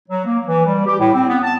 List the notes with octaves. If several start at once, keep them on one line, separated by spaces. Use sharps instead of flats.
F#3
A#3
E3
G3
G4
A2
C4
B3
A5